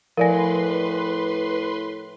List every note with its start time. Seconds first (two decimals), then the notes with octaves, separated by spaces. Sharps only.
0.17 A2 F3 A#4 B4 D5 G#5 C6 A#6